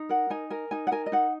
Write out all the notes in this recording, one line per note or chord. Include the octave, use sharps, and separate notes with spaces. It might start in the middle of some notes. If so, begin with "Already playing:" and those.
Already playing: D#4
A#4 F#5
D#4 G#5
A#4 G#5
D#4 G#5
F#5
A#4 G#5
D#5
D#4 F#5